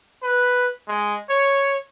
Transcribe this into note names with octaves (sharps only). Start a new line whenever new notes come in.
B4
G#3
C#5